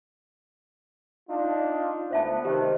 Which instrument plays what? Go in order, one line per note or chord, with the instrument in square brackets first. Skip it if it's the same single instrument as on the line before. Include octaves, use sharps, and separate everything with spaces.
[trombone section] D4 D#4 F4
[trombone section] D2 B3 [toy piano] C5 E5 A5
[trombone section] C3 D#3 [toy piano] G4 C5